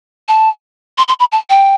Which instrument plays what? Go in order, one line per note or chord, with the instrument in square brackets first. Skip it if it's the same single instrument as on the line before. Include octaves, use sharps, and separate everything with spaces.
[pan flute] A5
C6
C6
B5
A5
G5